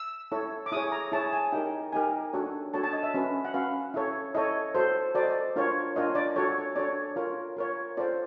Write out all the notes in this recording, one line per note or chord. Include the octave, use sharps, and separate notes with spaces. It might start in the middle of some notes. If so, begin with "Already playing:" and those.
Already playing: E6
E4 A4 C#5
D6
E4 G#4 C#5 D#6
A#5
E4 G#4 C#5 A5
G#5
D#4 G4 A#4 G5
D#4 G4 A#4 G#5
D4 F#4 A4 C#5
D4 F#4 A4 C#5 A5
A5
D#5
E5
C#4 F#4 B4
F#5
C#4 F#4 B4 F5
E4 A4 C#5
E4 A4 C#5 D#5
F#4 A4 C5
F#4 A4 C5 D5
D#5
D5
D4 F4 A#4 C#5
D4 F4 A#4 C#5 D#5
D5
D4 F#4 A4 C#5
C#5
D4 F#4 A4 C#5 D5
F4 A#4 C#5
F4 A#4 C#5
F4 A4 C5 D5